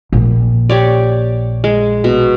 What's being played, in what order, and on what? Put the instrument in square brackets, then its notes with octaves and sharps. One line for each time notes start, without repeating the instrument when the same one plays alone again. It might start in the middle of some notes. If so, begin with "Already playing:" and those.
[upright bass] A#1
[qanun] G4 C#5 D5
G#3
B2